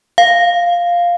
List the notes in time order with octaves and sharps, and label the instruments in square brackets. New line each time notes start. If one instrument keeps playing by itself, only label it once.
[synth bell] F5